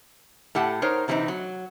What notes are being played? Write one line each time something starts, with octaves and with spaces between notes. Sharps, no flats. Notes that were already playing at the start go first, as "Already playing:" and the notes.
A2 G4 F#5 A5
D#4 A#4 C5 C#5
C3 E3 G#3 A3 C4 D#4
F#3